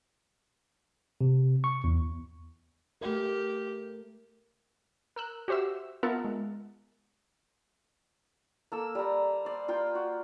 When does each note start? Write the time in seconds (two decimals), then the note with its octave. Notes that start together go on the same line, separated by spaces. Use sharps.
1.21 C3
1.64 C#6
1.84 E2
3.01 A3 G4 A#4
5.16 A#4 E6 F#6
5.48 F#4 G4 C5 E5 E6
6.03 B3 F4 A#4 E5 F#5 A5
6.25 G#3
8.72 A#3 A4 E6
8.95 G3 A#5
9.45 C5 D5
9.68 F4 A#4 G5
9.95 F#4